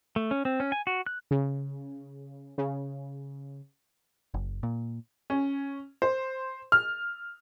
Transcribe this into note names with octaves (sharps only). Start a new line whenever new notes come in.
A3
C#4
C4
C#4
G#5
F#4
F#6
C#3
C#3
F#1
A#2
C#4
C5
F6